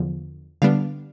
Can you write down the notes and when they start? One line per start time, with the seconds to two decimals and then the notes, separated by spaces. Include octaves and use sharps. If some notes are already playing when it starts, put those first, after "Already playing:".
Already playing: E2 D3 F3
0.62 D3 G3 B3 D4 F5